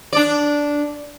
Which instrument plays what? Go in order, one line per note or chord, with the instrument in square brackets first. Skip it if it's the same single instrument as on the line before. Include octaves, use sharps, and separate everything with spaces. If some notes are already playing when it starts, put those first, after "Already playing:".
[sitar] D4 D5